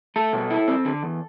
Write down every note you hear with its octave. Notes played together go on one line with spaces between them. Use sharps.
A3 A4
B2
E4
C4
D3
E2